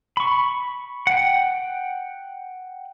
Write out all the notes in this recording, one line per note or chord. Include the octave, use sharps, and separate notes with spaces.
B5 C#6
F#5 G5